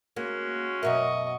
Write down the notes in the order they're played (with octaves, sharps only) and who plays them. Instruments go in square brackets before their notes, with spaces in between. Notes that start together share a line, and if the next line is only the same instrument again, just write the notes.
[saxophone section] G#3 C#4 F#4 [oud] A#3
[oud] F#2 B2 A#4 [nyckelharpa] D#5 C#6 [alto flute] E5